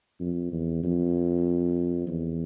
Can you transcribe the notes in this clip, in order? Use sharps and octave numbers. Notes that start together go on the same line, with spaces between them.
F2
E2
F2
E2